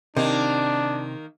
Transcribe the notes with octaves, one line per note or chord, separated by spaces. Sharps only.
C3 D#3 A#3 D4